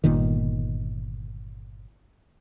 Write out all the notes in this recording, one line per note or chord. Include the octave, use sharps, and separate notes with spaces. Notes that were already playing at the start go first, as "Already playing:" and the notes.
G1 A#2 D#3